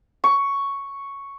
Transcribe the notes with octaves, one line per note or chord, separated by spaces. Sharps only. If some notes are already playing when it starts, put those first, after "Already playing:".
C#6